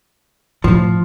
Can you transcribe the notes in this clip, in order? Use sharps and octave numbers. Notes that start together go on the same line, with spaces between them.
A2 D3 F3